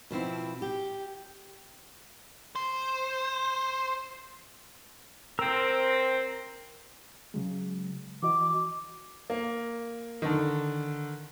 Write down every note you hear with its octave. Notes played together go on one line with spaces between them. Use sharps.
B2 F3 C4 E4
G4
C5
C4 A#4 A#5 E6
C#3 F#3 G#3
E3 F#4 D#5 D6
A#3
D3 D#3